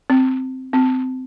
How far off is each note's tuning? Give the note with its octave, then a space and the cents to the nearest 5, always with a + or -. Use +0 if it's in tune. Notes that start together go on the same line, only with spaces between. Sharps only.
C4 -5
C4 -20